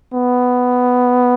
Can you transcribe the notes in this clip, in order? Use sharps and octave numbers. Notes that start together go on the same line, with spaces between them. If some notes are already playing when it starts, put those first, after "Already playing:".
B3